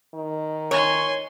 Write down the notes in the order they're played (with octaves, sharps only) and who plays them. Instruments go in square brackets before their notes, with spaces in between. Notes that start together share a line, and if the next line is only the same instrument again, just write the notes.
[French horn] D#3
[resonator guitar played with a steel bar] C#5 [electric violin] G#5 C6